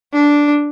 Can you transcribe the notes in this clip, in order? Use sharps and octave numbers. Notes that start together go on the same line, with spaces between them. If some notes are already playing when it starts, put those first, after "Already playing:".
D4